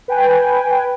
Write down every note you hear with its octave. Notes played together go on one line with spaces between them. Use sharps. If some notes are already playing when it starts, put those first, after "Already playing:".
B4 G5 G#5